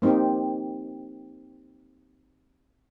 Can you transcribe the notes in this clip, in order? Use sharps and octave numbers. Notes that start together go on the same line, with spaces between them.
A#3 C4 D#4 G4